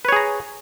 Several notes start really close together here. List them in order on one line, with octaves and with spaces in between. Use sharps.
B4 C#5 G#4 A#5